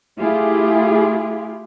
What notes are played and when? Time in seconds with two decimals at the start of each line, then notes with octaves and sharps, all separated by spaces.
0.19 A3 E4 F4 G4 G#4